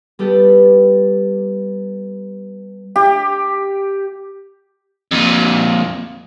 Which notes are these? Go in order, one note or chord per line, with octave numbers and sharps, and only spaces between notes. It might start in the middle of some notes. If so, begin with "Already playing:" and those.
G3 B3 G4 A4
G4
F2 A#2